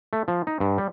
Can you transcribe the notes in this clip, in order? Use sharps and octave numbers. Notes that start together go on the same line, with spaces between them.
A3
F3
D#4
G2
G3